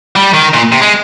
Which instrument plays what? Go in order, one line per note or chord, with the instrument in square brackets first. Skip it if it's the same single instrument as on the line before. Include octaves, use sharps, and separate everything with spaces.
[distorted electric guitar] G3
D#3
A#2
C3
G#3